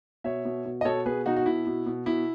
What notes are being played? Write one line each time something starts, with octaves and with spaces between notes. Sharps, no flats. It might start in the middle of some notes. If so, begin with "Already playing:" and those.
B2 C#5 E5
B2
B2
D#5
B2 A4 C#5
B2 G#4 B4
B2 D#4 F#4
F#4
B2 E4
B2
B2
B2 E4